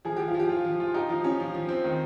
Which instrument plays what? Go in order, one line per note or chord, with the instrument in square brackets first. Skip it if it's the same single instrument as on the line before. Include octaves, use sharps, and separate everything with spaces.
[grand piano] F3 [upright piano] G#4
[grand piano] F3 [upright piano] G4
[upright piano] F4
[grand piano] F3
[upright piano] G4
[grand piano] F4
F3
F4
[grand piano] D#4 [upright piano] G4
[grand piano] F3 [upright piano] F4
[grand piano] F3 [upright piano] C#4
[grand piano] F3
F3
C4
D#3